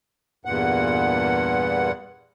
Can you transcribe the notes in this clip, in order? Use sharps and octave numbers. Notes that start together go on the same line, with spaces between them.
E2 G2 A#2 F#5